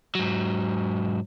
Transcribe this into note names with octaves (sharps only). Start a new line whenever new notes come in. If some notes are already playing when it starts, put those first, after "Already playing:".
G#2 F#3